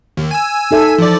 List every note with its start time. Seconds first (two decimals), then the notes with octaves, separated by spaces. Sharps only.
0.17 D#2
0.31 G#5 E6
0.71 D#4 A4 E5
0.98 E3 F3 D5